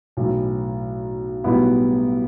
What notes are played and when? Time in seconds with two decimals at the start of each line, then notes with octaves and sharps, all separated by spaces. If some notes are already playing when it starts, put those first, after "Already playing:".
0.17 B1 A2 E3
1.44 B1 A2 G3 B3 E4